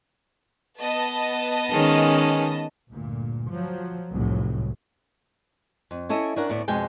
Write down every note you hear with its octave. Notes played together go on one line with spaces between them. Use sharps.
B3 D#5 A5
D#3 G#3 C#4
D2 G2 A#2
F3 F#3
F1 C2 A2 F#3
F2
C#4 E4 A4 D#5 E5
C#4 D4 A#4 F#5
D2 A2 B3 D5
F2 B2 G#3 G5 G#5